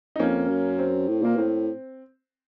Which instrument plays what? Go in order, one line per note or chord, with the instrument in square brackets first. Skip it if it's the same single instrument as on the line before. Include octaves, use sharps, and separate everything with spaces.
[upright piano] D#4
[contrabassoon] F2 [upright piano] A#3 C#4
[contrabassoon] F#2
[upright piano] C4
[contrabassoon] A2
[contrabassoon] A#2 [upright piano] A#3
[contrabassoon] A2 [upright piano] C4